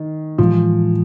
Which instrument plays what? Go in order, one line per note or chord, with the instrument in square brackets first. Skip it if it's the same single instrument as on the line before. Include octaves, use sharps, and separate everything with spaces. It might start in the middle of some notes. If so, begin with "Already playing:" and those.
Already playing: [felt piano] D#3
[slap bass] A2 E3 G#3 [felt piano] F3